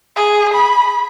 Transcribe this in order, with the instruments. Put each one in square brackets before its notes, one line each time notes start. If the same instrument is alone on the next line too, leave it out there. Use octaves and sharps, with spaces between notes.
[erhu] G#4
B5